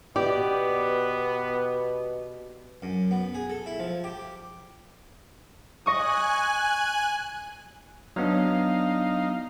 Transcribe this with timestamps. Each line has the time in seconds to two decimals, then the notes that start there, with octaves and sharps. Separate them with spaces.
0.16 B2 B3 G4 D5
2.82 F#2
3.11 B3
3.34 G#4
3.50 A4
3.66 E4
3.79 F3
4.04 G4
5.86 D#5 G#5 C#6 D#6 F#6
8.16 F#3 B3 D4 D#4 F5